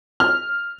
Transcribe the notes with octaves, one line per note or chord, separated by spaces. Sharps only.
F6